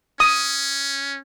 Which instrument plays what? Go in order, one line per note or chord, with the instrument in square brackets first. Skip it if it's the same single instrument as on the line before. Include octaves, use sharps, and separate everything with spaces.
[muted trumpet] C#4 [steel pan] D#6